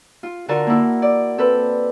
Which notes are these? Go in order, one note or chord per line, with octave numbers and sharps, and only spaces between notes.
F4
D3 F4 F#4 A#4 A5
A#3 E4
D5
C4 A4 B4